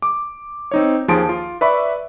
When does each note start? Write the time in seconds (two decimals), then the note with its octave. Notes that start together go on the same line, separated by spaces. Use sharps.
0.02 D6
0.71 C4 D#4 C#5
1.08 D#2 F3 G#4 A5 C6 D7
1.29 F4
1.61 B4 D5 E5 B5 C#6